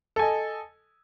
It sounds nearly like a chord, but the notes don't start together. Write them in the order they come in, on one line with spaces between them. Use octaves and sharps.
A4 G#5 D#5